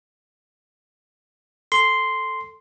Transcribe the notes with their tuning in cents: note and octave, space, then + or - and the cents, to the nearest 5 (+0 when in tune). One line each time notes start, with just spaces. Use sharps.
A4 +0 C6 -5